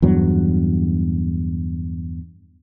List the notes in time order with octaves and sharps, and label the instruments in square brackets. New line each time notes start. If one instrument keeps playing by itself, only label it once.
[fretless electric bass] E2 G2 F#3